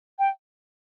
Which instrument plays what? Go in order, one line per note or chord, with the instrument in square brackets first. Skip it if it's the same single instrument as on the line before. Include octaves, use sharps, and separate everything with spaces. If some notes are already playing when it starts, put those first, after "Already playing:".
[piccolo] G5